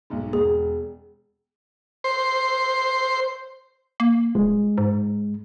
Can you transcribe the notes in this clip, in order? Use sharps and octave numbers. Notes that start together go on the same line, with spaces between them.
B1 G#2
E1 G#4
C5
A#3
D#1 G#3
G#2